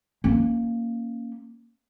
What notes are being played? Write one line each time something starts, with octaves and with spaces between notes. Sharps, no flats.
A#3 C#4